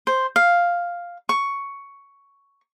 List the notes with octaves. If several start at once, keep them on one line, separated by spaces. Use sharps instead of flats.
C5
F5
C#6